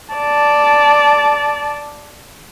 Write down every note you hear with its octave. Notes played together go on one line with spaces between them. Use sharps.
D5 A5